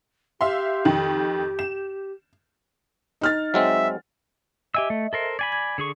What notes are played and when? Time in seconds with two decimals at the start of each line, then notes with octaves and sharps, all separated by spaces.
0.41 G4 E5 F5 C6
0.85 F2 D#3
1.59 E7
3.21 D#4 F6 A6
3.54 F#3 G#3 C4 E5
4.75 G4 D#5 E5 G#5 E6
4.90 A3
5.13 A4 A#4 C5
5.39 D5 G#5 B5 G#6
5.52 G#6
5.78 D3 G#4 C#6